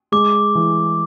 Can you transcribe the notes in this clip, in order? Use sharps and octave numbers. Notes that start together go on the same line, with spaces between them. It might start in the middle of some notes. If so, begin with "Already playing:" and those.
G#3 D6
E3